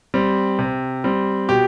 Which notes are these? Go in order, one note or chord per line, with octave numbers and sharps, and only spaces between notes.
G3 C4
C3
G3 C4
B2 G4